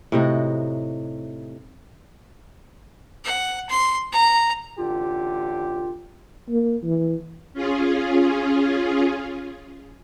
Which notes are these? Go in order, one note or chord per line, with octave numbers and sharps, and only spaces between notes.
A2 C3 D#4 F#4
F#5
C6
A#5
A1 D3 F4 G4
A#3
E3
C#4 F4 G#4